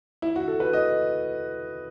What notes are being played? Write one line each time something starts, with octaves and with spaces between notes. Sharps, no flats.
E4
F#4
A4
B4
D#5